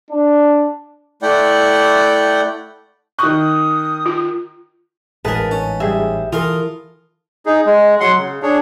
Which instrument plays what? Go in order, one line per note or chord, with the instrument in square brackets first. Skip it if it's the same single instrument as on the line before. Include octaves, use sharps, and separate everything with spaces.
[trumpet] D4
[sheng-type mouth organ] A3 E4 D5 F#5 G5
[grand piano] D#3 F#6 [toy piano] C#6 [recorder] D#6
[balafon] F4
[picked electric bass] A1 G#2 [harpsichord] G#4 A#4 [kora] B4 [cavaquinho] A5
[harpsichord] C#4
[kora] G3 G#4 [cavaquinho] E5
[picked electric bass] E3 [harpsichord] F4 A#4 F5 [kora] A4 [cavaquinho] D#6
[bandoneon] D#4 G#4
G#3
F#3 F#5 C6
C#3
D4 G#4 C#5